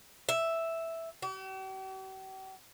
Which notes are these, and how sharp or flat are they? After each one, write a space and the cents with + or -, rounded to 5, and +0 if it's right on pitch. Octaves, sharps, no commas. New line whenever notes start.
E5 +0
G4 -45